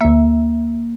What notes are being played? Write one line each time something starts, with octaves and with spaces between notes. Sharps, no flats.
D2 A#3 E5